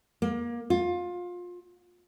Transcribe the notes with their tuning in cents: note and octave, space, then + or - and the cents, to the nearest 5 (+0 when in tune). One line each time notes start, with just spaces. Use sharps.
A#3 +25
F4 +25